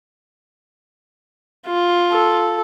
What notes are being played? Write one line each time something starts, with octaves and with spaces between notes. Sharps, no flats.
F4
A4